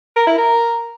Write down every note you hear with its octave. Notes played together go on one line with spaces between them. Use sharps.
A#4
E4
A#4